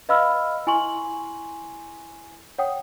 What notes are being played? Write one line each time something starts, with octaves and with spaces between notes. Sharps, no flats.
B4 D#5 F5 B5 E6 F6
E4 G#5 C6 C#6 F#7
C#5 F#5 G5 D#6